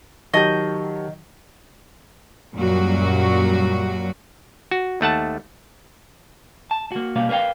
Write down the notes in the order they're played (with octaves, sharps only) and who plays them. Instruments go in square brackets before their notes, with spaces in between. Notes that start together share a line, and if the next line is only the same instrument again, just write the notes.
[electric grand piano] D#3 F#3 [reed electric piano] G4 A5 C#6 [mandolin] D#5 G6
[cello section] F#2 A#2 F#3 G3 F#4
[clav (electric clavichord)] F#4
D#2 A3 F#5 A5
[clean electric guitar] A5
A#3 F#4
B2 G3 A#3 B4 F5
A#4 B4 C#5 F5 G5